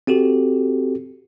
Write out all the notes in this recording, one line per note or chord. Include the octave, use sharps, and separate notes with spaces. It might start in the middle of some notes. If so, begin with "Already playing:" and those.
C4 F#4 G4 A4